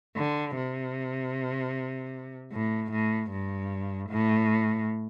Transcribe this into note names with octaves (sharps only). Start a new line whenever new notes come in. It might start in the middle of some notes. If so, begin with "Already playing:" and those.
D3
C3
A2
A2
G2
A2